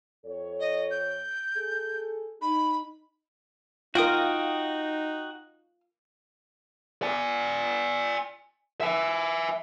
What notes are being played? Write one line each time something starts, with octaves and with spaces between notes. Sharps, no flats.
F2 A4 C#5
D#5
G6
G#4 A4
D#4 B5
D#4 F4 F#4 A#4 F5 G5 D#6
D5 G#5
E5 G#5